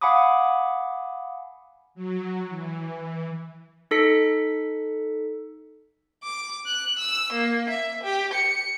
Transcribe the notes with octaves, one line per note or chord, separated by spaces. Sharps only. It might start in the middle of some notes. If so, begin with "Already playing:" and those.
F5 F#5 G#5 B5 D6 D#6
F#3
E3
D#4 A4 B6 C#7
D6
F#6
E6
A#3
E5
G4
C#7